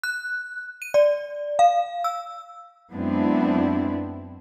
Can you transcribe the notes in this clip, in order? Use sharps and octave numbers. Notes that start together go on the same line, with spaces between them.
F#6
D#7
D5
F5
E6
F#2 G#3 B3 C4 D4 E4